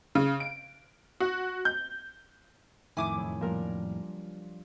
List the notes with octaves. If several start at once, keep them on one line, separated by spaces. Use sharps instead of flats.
C#3
D7
F#4
G6
F2 A2 D#3 E4 G#5 D6 D#6
F#1 C#5
A#2 F3 G3 D4 A#4